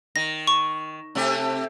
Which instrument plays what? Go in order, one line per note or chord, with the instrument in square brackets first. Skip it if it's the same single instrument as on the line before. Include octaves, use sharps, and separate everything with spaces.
[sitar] D#3 [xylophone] A#6
[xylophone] C#6
[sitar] C3 A3 G4